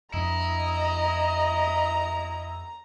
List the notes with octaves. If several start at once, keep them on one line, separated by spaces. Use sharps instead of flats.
F2 D4 E4 D#5 A#5